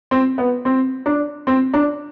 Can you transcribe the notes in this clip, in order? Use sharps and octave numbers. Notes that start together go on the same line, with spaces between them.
C4
B3
C4
D4
C4
D4